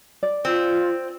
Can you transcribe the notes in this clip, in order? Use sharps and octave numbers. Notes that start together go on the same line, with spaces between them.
D5
C4 F4